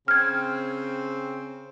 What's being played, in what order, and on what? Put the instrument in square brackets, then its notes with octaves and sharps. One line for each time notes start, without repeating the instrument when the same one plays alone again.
[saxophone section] C#3 C4 [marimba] F6 G#6